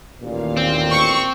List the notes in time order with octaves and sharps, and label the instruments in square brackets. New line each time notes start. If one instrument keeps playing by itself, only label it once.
[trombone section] A1 A#2 [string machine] D#2 F5
[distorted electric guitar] C4
[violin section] C#6